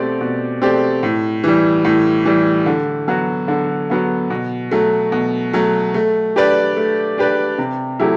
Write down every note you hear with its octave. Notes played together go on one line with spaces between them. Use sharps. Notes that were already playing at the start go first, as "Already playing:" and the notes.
Already playing: B2 A3 C4 G4 D5
B2
A3 C4 G4 D5
A2
E3 G3
A2
E3 G3
D3
F#3 B3 F#4
D3
F#3 B3 F#4
B2
F#3 A3
B2
F#3 A3
A3
D4 G4 B4 D5
A3
D4 G4 B4 D5
C3
F#3 A3 E4 G4